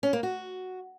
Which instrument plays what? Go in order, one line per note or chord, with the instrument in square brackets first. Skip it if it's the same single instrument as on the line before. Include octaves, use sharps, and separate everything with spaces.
[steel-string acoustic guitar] C#4
A#3
F#4